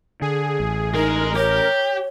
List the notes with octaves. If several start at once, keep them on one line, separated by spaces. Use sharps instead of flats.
D3 G#4
A1
G#3 D#4 G#4 A#4
G4 C#5